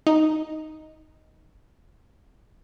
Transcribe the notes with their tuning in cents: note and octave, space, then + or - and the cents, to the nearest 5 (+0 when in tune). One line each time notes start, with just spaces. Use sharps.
D#4 +10